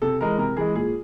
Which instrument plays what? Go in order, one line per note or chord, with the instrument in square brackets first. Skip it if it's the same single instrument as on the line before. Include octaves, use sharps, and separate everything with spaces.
[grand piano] C3 A4
E3 G#3 A#4
C3 A#4
E3 G#3 G#4
A#2 G#4